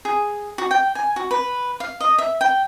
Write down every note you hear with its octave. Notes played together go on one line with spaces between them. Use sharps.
G#4
F#4
G5
G#5
F#4
B4
F5
D#5
E5
G5